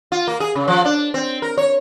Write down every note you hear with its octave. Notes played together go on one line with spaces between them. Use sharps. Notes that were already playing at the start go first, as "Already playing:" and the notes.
F4
A#3
G#4
C#3
F3
D4
C4
A#4
C#5